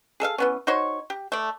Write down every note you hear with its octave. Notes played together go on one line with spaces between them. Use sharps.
G#4 A4 E5 F5
E3 B3 C#4
D#4 F#4 C5 C#5
G4
A3 D5